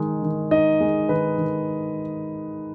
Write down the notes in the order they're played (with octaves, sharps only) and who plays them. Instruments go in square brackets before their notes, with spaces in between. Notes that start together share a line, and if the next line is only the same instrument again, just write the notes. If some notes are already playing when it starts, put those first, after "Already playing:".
Already playing: [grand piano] D#3 G#3 D#4
D#3
D#4 D#5
G#3
D#3 B4
D#3